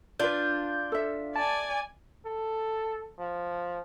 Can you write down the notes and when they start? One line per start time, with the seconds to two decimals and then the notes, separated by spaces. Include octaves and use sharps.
0.20 D4 F4 B4 D5 G6
0.92 A4 E5
1.36 D5 G#5 A5
2.26 A4
3.19 F3